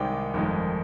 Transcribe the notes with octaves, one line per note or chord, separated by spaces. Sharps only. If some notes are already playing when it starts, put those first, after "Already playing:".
Already playing: C2 C3 D#3 G#3 G5
G1 F2 D#3 G#3